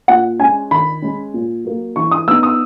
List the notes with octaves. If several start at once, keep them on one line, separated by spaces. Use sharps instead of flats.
A#2 F#5
G#3 C#4 G#5
D#3 B5
G#3 C#4
A#2
F#3 A#3
E3 C#6
D#6
B3 D#4 E6
D#6